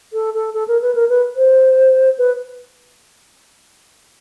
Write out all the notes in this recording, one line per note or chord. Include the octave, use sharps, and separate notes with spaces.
A4
A4
A4
A#4
B4
A#4
B4
C5
B4